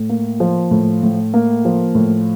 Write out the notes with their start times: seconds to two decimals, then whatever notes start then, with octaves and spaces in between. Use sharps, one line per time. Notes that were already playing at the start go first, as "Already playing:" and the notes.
Already playing: A2
0.09 A#3
0.40 F3
0.71 A2
1.03 A2
1.34 A#3
1.65 F3
1.95 A2